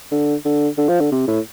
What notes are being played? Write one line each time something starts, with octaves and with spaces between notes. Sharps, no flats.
D3
D3
D3
F3
D3
C3
A2